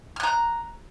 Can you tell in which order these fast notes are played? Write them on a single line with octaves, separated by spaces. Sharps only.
F6 F#6 A#5